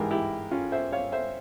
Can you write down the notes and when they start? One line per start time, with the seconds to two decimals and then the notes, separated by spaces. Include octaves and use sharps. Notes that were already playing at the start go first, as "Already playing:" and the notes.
Already playing: G#2 E3 G#3 G4 A#4
0.11 E4 G4
0.51 C#4 F4
0.72 C5 E5
0.92 C#5 F5
1.12 C5 E5